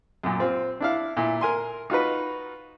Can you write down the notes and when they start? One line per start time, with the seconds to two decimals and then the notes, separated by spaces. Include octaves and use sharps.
0.24 F#2 A#2
0.40 C4 F4
0.80 D4 E4 F5
1.17 A#2 E4
1.41 A#4 G#5 C6
1.90 D#4 F4 F#4 B4